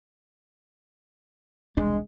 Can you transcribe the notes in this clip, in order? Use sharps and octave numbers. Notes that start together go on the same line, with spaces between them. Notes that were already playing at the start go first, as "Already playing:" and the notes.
E1 C2 G#3 D4